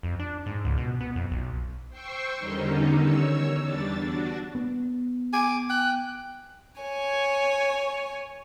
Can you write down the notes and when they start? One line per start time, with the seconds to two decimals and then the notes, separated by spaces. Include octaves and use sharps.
0.03 F2
0.19 D4
0.46 G#2
0.65 C#2
0.77 B2
1.00 B3
1.16 F2
1.31 B1
1.89 C5 G5 C6 C#6 E6
2.39 E2 D3 D#3 G3 C#4 D#4
2.96 C#5 E6
3.61 E2 G3 D4 A6
4.01 D4 F#4
4.55 B3
5.33 G#5 D6
5.70 G5 F#6
6.82 C#5 G#5